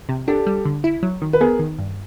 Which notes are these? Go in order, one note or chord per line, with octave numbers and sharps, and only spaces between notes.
C3
D4 G4 A4
G3
D3
E4
F#3
D#3
B4
B3 G#4 A#4
D#3
G2